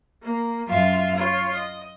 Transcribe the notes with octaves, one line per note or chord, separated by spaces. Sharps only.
A#3
F#2 F4 E5 F5
F4 C#5
D#5